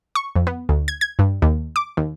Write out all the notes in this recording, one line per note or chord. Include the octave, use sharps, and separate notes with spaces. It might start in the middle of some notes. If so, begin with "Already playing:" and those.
C#6
F2
B3
D2
G#6
G#6
G2
D#2
D6
D#2